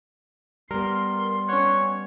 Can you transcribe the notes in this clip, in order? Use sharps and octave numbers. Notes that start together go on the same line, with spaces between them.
G3 B3 A#4 C6
C#4 C#5 F#5